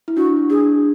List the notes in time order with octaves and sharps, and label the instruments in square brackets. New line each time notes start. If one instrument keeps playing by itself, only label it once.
[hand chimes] E4
[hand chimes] D4 [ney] F#4
[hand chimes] D4 [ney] G#4